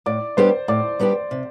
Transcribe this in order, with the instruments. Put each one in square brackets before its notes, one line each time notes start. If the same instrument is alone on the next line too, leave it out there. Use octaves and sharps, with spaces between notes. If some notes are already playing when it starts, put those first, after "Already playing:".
[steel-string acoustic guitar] A2 [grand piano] D5 D6
[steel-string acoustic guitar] G3 B3 D4 G4 [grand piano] C5 C6
[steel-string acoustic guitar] A2 [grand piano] D5 D6
[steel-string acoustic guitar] G3 B3 D4 G4
C3